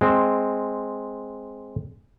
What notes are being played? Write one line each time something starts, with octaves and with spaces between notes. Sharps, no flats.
G#3 C4